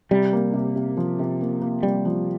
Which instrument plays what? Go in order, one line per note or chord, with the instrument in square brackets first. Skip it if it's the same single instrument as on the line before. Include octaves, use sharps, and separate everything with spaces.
[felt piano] C3 [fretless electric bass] G3
[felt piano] A#3
C3
C3
F3
C3
A#3
A#3
[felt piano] C3 [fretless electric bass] G3
[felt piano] F3